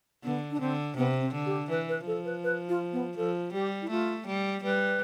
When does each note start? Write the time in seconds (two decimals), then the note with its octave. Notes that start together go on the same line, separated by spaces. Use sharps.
0.24 D3 B3
0.51 D4
0.60 D3 C4
0.97 C3 B3
1.21 C4
1.34 D3
1.46 G4
1.70 E3 B4
1.89 B4
2.07 F3 A4
2.25 B4
2.44 B4
2.69 F4
2.93 B3
3.17 F3 A4
3.53 G3 G4
3.82 E4
3.90 A3 F4
4.27 G3
4.63 G3 B4